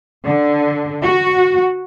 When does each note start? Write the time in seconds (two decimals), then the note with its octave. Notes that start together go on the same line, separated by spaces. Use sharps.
0.24 D3
1.04 F#4